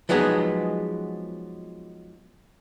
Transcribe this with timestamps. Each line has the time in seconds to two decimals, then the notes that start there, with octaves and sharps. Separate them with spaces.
0.09 F3 F#3 G#3 B3 D#4 G#4